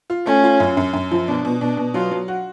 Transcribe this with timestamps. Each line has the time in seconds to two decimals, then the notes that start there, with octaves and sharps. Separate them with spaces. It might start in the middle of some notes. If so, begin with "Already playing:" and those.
0.10 F4
0.27 A3 C#4
0.44 F4
0.60 F#2
0.77 F#2
0.93 F#2
1.11 F3
1.28 B2 D4
1.45 B2
1.61 B2 D4
1.77 B2
1.94 F#3 F4
2.11 F#3
2.28 F#4